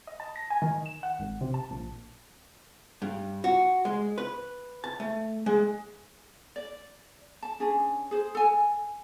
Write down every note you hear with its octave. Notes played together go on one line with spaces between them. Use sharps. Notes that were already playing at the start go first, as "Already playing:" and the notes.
D#5
A5
A#6
G#5
D#3
E7
F#5
G#1
C3
A5
A#1
G2
F#4
G#3
B4
A5
A3
G#3
D5
A5
C#4 D4 G#4
G#4 C5
A4 G#5